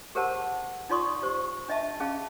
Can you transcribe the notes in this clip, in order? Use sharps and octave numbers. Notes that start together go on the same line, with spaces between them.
G4 G#4 A#4 C5 F#5 A5
D#4 F4 D5 C6 C#6 D#6
G4 C5 C#6
D4 D#5 E5 A5
C#4 G#4 F5 A5